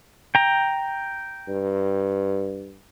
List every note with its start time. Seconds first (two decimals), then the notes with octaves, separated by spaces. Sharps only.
0.35 G5 A#5
1.48 G2